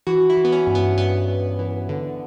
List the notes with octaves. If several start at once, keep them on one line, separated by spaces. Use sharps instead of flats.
E3 F#4
E4
E3
B3
C#4
G2
B3
G2 B3
G2
E3
D3